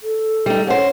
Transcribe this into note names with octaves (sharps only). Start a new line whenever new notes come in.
A4
G3 D#4
C#4 C5 F#5